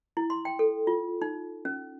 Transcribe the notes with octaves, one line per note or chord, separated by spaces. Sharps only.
E4
C6
G5
A4
F4
D#4
C#4